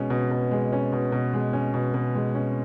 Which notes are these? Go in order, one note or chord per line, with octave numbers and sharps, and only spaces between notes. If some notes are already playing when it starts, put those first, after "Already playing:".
Already playing: B2 G#3 C#4
B2
B2
G#3
C#4
B2
B2
G#3
C#4
B2
B2
G#3
C#4